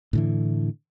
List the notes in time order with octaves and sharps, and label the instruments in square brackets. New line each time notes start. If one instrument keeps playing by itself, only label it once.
[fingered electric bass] A2 D3 E3